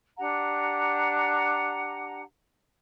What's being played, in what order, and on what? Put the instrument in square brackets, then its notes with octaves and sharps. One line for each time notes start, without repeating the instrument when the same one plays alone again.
[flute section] D4 G4 F#5 A#5